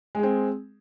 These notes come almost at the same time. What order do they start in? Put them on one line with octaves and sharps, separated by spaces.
G#3 G#4 C4